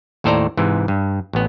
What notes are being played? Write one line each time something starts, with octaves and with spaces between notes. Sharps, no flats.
D#2 A2 A4 C5 D5 A#5
G#2 C3 E3
G2
A1 B3